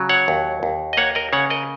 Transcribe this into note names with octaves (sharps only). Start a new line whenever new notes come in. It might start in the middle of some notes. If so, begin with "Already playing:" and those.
Already playing: C#3 F#3
C#5 F#5
D#2
D#2
D#5
A#3 C#5 F#5
A#4 D#5
C#3 C#5 F#5
A#4 D#5